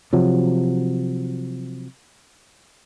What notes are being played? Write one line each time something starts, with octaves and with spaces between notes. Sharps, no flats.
C3 F3 F#3